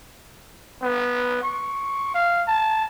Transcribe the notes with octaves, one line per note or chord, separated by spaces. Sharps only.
B3
C#6
F5
A5